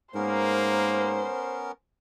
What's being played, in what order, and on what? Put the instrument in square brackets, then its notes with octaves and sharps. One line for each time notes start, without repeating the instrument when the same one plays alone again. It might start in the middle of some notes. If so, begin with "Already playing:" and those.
[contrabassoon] G#2 [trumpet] A#3 [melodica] B3 C#4 A#4 [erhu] C5